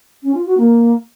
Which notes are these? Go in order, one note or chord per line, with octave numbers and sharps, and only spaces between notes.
C#4
F4
F#4
A#3